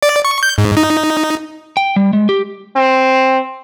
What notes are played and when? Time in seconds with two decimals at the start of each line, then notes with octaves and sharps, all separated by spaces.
0.03 D5
0.25 C#6
0.43 G6
0.58 G#2
0.77 D#4
1.77 G5
1.96 G3
2.13 G#3
2.29 G4
2.76 C4